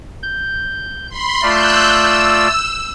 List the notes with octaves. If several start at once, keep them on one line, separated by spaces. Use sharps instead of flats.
G6
B5 C6
A3 F4 D5 E6 F#6 G6
E6